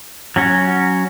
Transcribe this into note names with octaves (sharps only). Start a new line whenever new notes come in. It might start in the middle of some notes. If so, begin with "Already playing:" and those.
F#3 C#4 F#4